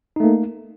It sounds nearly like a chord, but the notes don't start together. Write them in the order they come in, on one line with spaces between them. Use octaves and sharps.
D#4 A3 A#3